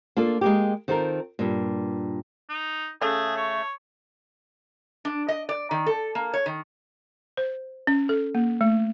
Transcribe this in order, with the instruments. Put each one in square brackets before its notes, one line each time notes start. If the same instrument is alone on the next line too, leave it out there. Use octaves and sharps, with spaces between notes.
[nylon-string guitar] A#3 D4 F4 A4
G#3 A#3 G4
D#3 C4 F4 A4 A#4
G2 A#2
[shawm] D#4
[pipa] C#3 A3 [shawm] G#4
[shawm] C#5
[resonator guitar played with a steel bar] D4
D#5
D5
D#3
A4
A#3
C#5
D#3
[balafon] C5
C#4
A4
A#3
A3